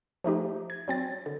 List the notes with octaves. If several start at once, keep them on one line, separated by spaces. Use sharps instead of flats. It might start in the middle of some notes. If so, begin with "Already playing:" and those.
F3 A3 D#4 G4
G#6
F#3 C4 A6
D3